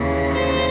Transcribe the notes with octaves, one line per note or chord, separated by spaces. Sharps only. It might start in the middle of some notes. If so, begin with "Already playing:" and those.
Already playing: D#2 C#3 E3
C5